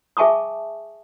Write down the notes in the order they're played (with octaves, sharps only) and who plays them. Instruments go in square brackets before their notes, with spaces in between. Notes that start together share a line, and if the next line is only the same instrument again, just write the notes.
[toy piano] G#4 E5 G#5 A5 C#6 D#6